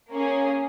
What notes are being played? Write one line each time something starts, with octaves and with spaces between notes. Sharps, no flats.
A#3 C#4 G#4